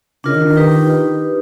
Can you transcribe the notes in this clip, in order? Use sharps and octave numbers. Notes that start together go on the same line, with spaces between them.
C#3 D4 F4 A#4 D#5
D#3
D#3
D#4 G4 B4